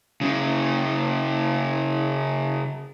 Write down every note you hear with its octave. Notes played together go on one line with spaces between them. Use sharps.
C#3 F#3